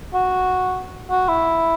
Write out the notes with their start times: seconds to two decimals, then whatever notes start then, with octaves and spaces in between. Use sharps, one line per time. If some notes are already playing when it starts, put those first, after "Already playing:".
0.14 F#4
1.10 F#4
1.28 E4